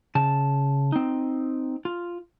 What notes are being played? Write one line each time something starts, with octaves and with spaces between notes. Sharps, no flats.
C#3 A5
C4 D#4
F4